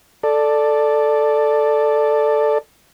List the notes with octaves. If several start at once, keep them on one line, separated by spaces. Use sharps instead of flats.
A4 D5